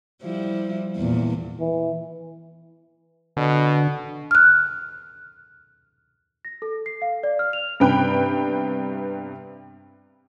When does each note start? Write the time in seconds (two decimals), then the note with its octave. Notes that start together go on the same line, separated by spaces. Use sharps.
0.23 F3 G3 E4
0.96 E2 A#2
1.60 E3
3.37 B2 D3
4.31 F6 F#6
6.45 A#6
6.62 A4
6.86 C7
7.02 F5
7.23 D5
7.39 F6
7.53 F7
7.80 G2 C3 B3 G5 B5 F#6